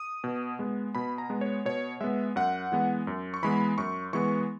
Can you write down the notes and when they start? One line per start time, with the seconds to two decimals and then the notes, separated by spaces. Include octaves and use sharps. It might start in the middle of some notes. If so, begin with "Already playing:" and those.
Already playing: D#6
0.24 B2
0.59 G#3 B3
0.95 B2 B5
1.18 A#5
1.30 G#3 B3
1.41 C#5
1.65 B2 C#5
2.01 G#3 B3 E5
2.36 F#2 F#5
2.72 E3 G#3 B3
3.07 F#2
3.34 C#6
3.43 E3 G#3 B3 B5
3.78 F#2 C#6
4.13 E3 G#3 B3 C#6